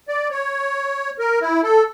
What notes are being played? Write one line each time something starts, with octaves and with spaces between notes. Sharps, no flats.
D5
C#5
A#4
E4
A4